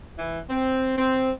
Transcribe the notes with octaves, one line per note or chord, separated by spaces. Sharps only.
E3
C4
C4